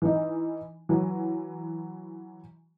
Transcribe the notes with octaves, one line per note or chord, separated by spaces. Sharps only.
E3 D#4
E3 F#3